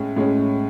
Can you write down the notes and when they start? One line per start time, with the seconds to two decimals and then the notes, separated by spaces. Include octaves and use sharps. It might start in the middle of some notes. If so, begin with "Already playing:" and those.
Already playing: A2 G#3 C#4
0.16 A2 G#3 C#4